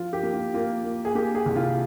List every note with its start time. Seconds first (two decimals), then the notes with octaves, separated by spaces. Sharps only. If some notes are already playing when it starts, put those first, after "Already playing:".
Already playing: F3 F4
0.13 G4
0.23 A#3
0.33 F4
0.54 A#3 F4
0.84 A#3
1.05 G#4
1.15 A#3 G4
1.35 G#4
1.46 C2
1.56 F4